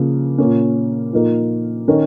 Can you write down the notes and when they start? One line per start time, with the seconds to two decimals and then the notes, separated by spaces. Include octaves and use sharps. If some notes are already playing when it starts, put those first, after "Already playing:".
Already playing: C#3 F3 A#3
0.38 A#2 A#3 C#4
1.12 A#2 F3 A#3 D#4 A#4
1.88 D#3 C#4 A#4